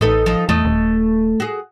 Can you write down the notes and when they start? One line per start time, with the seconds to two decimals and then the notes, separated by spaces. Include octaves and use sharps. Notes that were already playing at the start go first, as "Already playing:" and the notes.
0.01 A1 D#4 A4 B4
0.26 F3 D#4
0.49 E2 A3 D#5
0.65 D#1
1.40 F#4 G#4